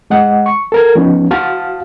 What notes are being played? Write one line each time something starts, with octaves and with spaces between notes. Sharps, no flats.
G#3 D#5 F#5
C#6
A4 A#4 G#6
F3 B3 C#4 D#4
F#4 F5 A5 F6